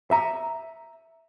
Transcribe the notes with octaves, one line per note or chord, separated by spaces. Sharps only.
E5 A#5